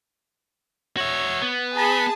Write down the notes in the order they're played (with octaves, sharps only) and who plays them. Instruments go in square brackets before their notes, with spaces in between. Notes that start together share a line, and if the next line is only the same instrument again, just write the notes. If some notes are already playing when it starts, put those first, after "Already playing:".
[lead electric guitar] F#4 E5 [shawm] C#5
[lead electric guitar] B3
[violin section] G#4 A5 [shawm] B5